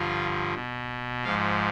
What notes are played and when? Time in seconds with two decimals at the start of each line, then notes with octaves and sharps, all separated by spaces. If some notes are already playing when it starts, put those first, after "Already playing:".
Already playing: G2 D3 F3 F4
0.54 B2
1.24 G#2 F3 F4